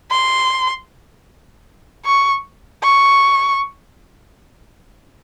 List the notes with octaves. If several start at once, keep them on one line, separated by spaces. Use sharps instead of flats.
C6
C#6
C#6